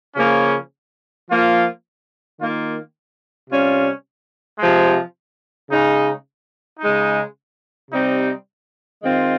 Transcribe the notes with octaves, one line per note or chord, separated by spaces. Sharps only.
C#3 F3 A#3 C#4
F3 A#3 F4
D#3 A#3 F4
C3 G3 C#4 F4
C3 F3 G#3
C#3 G#3 D#4
C#3 G#3 D#4
C3 G3 C4 D#4
D#3 G#3 C4 F4